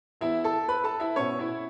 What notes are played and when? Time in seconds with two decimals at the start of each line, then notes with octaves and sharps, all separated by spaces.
0.21 E2 E3 B3 E4 E5
0.44 A4 A5
0.68 B4 B5
0.84 A4 A5
1.00 E4 E5
1.16 B2 B3 C#4 C#5
1.39 E4 E5